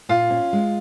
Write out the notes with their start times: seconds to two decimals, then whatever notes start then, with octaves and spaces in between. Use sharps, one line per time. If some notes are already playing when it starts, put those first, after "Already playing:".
0.09 A#2 F4
0.30 C#4
0.53 G#3